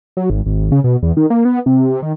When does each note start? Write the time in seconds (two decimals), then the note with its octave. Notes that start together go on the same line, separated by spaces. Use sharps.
0.17 F#3
0.30 G#1
0.46 G#1
0.72 C#3
0.84 B2
1.03 E2
1.17 D#3
1.30 A#3
1.45 B3
1.66 C3
2.02 D#3